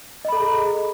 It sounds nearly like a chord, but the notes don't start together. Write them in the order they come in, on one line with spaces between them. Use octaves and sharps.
D#5 B5 A4 A#5 G#4